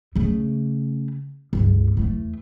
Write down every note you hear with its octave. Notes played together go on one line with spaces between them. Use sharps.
C#3 A3
G1 C#2
E2 A3